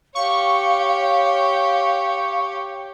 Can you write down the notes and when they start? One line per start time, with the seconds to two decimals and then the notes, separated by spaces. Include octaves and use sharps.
0.15 G4 C#5 F5 C#6